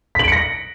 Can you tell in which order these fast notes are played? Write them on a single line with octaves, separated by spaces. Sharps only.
B6 F#7 D7 C#7 A#6